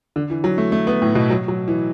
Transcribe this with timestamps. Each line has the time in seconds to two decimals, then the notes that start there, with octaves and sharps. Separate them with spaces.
0.16 D3
0.30 E3
0.44 F#3
0.58 A3
0.72 A3
0.87 B3
1.02 A2
1.15 B2
1.30 F#3
1.48 F#3
1.68 E3